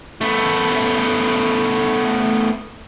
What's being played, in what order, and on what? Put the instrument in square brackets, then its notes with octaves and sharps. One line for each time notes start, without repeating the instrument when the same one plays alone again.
[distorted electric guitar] A3 B3